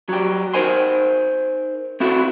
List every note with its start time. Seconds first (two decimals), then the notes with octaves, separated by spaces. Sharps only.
0.09 F#3 G4
0.54 D#4 A#4 C5 G#5 C6
2.00 C4 E4 F#4 A4